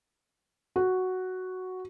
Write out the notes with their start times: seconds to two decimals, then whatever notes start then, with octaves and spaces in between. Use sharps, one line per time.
0.76 F#4